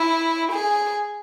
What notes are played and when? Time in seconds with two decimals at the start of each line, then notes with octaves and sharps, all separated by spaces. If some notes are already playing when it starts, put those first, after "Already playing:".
Already playing: E4
0.52 G#4